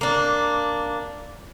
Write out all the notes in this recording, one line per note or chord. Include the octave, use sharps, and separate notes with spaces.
A#3 D4